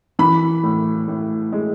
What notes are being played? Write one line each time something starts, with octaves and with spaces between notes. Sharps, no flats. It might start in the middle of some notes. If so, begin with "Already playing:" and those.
E3 B5
A2
A2
G#3